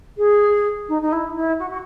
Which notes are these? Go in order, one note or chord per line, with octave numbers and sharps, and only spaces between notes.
G#4
D#4
D#4
E4
E4
F#4
F#4